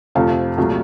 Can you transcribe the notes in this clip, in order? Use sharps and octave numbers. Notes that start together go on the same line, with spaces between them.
F2 C3 F3 A3 F5
C2 A#2 F#3 A3